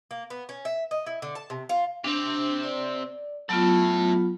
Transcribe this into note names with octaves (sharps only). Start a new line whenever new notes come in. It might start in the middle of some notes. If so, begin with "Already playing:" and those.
A#3
B3
C#4
E5
D#5
E4
D3
A5
C3
F4
C3 C4 D4
D5
A2 F#3 B3 F4 A4